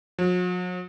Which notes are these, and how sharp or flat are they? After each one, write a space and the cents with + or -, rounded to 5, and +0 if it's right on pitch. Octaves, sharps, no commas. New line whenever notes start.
F#3 -45